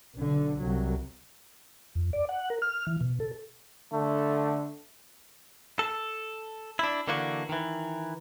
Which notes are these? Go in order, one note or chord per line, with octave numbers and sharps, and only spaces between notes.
B1 D3
C2 F#3
F2
D5
F#5
A#4
F6
E3
B2
A4
D3 A3
A4
D4 E4
D3 E3 A#3 D4 F#4
D#3 E3